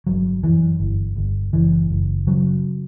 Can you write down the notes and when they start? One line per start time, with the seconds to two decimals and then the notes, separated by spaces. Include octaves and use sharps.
0.07 G1 F#3
0.43 F#2 E3
0.80 G1
1.16 G1
1.53 F#1 E3
1.90 F#1
2.27 C#3 F#3